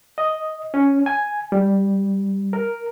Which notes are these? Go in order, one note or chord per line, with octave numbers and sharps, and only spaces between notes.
D#5
C#4
G#5
G3
A#4